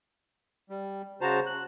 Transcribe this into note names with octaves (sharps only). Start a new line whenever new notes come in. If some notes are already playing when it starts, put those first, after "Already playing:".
G3
C#3 F#4 C5 A5 A#5
F#6